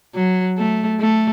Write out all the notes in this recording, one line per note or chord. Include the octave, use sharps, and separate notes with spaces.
F#3
A3
A3